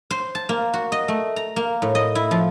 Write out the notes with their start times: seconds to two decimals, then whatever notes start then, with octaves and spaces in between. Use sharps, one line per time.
0.11 C5
0.35 A5
0.49 A#3
0.73 F#4
0.92 D#5
1.08 A3
1.36 A#5
1.56 A#3
1.82 A2
1.95 D#5
2.15 E4
2.31 F3